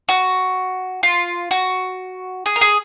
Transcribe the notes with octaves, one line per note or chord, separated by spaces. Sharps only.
F#4
F4
F#4
G#4
A#4
G#4